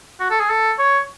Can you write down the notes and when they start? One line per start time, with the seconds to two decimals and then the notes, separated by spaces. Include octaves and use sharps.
0.20 F#4
0.30 A4
0.40 G#4
0.50 A4
0.79 C#5